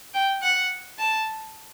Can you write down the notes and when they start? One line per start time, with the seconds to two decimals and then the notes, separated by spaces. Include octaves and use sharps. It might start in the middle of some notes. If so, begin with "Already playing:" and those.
0.14 G5
0.42 F#5
0.99 A5